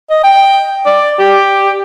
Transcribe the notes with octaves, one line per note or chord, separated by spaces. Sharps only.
D#5
G5
D5
G4